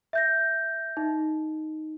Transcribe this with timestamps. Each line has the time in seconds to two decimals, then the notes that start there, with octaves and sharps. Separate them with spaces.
0.13 E5 G6 A#6
0.97 D#4